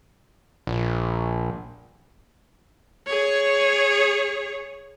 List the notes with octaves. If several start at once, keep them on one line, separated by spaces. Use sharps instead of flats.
A#1
G#4 C#5